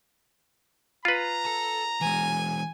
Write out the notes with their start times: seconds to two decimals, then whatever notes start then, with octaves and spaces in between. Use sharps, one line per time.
1.05 F4 B4 A#5
1.45 A4 A5
2.01 E3 G#3 G#5